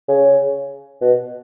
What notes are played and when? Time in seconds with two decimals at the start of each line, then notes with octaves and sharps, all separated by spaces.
0.08 C#3
1.02 B2